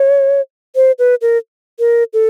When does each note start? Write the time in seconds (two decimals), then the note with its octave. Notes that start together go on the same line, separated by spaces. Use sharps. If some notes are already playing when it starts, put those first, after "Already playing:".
Already playing: C#5
0.76 C5
0.99 B4
1.22 A#4
1.79 A#4
2.14 A4